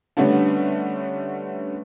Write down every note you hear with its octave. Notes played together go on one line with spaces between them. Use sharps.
D3 G3 A3 B3 C#4 D4